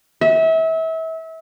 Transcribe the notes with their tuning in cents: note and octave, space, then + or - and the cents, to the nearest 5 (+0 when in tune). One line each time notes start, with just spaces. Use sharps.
E5 -30